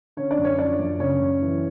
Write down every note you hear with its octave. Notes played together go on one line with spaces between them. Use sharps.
D3 C#4 C#5
D4 D5
F#2
C#4 C#5
F3 D4 D5
F#2
C#3 C#4 C#5
F#2
E3